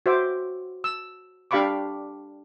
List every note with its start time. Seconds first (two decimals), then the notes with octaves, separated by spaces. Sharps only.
0.06 F#4 C5 E5 D6
0.84 E6
1.51 D4 G4 F5 B5 C#6 D6